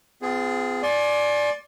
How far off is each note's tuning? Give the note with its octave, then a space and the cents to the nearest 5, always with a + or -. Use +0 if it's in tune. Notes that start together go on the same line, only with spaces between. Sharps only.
C4 -45 F4 +0 G#4 +0
D5 +0 G#5 +25 C6 +35